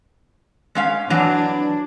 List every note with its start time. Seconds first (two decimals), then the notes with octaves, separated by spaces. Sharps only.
0.75 G#3 C#4 F5
1.10 E3 F#3 D4